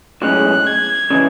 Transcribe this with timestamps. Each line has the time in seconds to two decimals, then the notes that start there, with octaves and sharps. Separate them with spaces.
0.22 B1 A2 G#3 C#4 F#6
0.66 G#6
1.10 C#3 E3 G#3